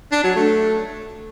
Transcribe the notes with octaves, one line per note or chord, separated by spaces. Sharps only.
D4
F#3
A3